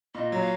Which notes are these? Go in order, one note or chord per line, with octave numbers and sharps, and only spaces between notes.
A#2 D#5
F#3
F5